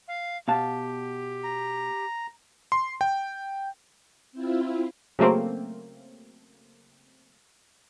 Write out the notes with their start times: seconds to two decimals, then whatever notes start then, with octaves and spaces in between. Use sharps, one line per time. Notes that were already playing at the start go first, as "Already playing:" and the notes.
0.08 F5
0.48 B2 G4 F5 A5
1.44 A#5
2.72 C6
3.01 G5
4.32 C4 E4 F4
5.19 C#3 F#3 A3 A#3 C4